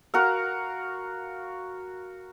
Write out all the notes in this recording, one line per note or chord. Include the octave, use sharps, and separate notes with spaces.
F#4 A#4 F5